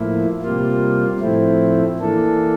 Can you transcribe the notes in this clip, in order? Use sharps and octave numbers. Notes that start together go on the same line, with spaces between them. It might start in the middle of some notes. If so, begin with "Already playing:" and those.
Already playing: A2 F3 A#3 E4
C3 G3 A#3 F4
A2 F3 A3 C4 E4
E3 A#3 D4 A4